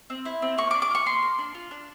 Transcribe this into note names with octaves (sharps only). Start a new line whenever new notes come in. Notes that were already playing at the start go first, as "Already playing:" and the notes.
C4
E4
C4
A#3 C#6
D6
D4
D6
F4 C#6
A#3 C6
A#3
D4
F4
D4